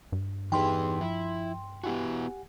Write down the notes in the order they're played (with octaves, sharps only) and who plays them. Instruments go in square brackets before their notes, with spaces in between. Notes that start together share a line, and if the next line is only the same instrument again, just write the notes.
[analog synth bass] G2
[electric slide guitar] E2 B4 [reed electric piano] D#4 G4 G#4 [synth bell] G5 C6
[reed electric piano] F3 [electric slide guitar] E4
[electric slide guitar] B3 E4 F#4 [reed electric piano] G4 F#5 G#5